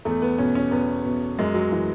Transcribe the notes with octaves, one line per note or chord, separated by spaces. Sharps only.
E2 A3
B3
B2 C#4
C#4
E2 B3
B2
F#2 G#3
F#3
E3